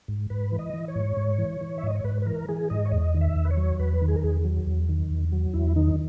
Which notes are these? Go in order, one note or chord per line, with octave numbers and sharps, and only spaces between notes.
G#2
G#2 B4
E3
D#5
E3
C#5
G#2
G#2
E3
E3
E5
G#2 D#5
C#5
G#2 B4
B4
E3 A#4
E3 G#4
G#2 D#5
C#5
E2 D#5
D#3
E5
E2
B4
C#5
F#3
E2 B4
D#3
G#4
A#4
E2 G#4
F#3
E2
D#3
E2
F#3
E2 E4
D#3 D#4